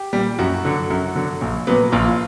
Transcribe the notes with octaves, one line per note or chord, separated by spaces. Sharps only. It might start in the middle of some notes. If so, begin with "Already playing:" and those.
Already playing: G4
A#2 G3
F#2 F#4
D3 F#3
F#2 F#4
D3 F#3
A#1
A#2 F#3 B3
A#1 F4